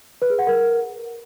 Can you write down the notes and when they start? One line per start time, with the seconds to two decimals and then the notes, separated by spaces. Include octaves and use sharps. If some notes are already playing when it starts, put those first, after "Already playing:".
0.22 B4
0.30 G#4
0.39 F#5
0.47 A#4